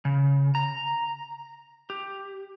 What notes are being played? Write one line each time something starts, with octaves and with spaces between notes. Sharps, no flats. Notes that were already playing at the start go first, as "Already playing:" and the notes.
C#3
A#5
G4